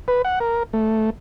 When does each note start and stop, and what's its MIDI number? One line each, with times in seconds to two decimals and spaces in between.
0.08 0.22 71
0.25 0.39 78
0.40 0.63 70
0.73 1.10 57